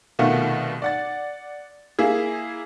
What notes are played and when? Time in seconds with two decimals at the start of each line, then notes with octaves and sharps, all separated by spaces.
0.19 C2 B2 D#3 A3 F4 F#5
0.82 D5 F#5 A6
1.99 A#3 E4 G#4